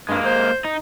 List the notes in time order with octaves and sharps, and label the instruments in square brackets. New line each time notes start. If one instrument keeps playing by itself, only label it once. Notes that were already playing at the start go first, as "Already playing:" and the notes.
[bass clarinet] G2 [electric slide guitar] G#3 A#3
[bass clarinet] C5
[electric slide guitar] D#4